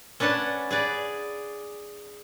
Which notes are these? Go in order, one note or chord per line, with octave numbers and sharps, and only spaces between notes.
C#4 D4 B4 F#5 A5
G#4 B4 D5